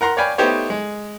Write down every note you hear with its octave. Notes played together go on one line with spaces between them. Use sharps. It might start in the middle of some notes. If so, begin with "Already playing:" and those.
A#4 F#5 A#5 C6
C#5 D5 F5 G5 G#5 B5
A3 B3 D#4 G4 C5 C#5
G#3